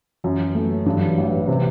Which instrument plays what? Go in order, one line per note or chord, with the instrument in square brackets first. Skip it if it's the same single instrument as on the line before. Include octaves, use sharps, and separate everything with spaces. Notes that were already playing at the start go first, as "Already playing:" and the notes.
[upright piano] F#2 [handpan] E3
[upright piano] A3
[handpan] F#3
[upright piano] G2 [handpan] E3
[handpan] F#3
E3
[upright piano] A1
C3